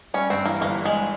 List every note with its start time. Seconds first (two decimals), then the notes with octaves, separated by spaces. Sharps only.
0.14 G3 C#4
0.30 G2 C4
0.45 E3 A#3
0.61 G1 A#3
0.77 G3
0.85 G#3